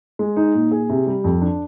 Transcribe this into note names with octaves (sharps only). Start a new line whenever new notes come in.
G#3
D#4
A#2
G#4
C3
G3
F2
D4